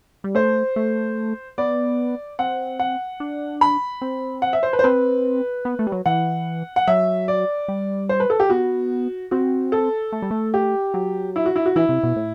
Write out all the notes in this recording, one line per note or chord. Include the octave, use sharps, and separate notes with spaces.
G3
A3 C5
A3
B3 D5
C4 F#5
F#5
D4
B5
C4
F#5
E5
C5
B4
C5
C4 B4
B3
A3
G3
F#3
E3 F#5
F#5
F#3 E5
D5
G3
C5
B4
A4
G4
B3 F#4
C4 F#4
A4
A3
G3
A3
G4
F#3
E4
F#4
E4
F#4
E3 E4
C3
B2
A2